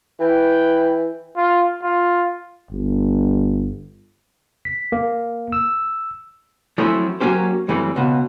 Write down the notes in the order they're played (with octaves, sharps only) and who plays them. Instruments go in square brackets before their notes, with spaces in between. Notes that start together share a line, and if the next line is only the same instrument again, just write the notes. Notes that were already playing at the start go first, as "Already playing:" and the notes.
[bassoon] E3 [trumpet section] B4 G5 B5
[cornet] F4
F4
[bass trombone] G1
[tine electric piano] B6
A#3
E6
[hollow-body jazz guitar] F3 F#3 A3 C4 C#4 E4
F#3 A#3 C#4 G4 C5
F#2 E3 G3 A3 C4
C#2 B2